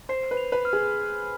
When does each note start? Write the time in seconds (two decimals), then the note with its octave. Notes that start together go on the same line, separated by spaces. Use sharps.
0.09 C5 C7
0.31 B4
0.37 F7
0.52 B4
0.65 F6
0.73 G#4